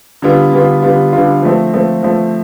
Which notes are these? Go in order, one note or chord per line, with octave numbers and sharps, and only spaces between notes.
D3 G3 B3 F4
D3 G3 B3 F4
D3 G3 B3 F4
D3 G3 B3 F4
F3 A3 C4
F3 A3 C4
F3 A3 C4